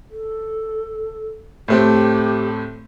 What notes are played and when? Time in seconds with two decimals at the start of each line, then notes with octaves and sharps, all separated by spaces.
0.10 A4
1.68 A2 A3 C4 G4